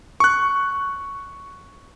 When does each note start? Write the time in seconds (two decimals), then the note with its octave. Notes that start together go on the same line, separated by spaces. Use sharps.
0.20 C#6 F#6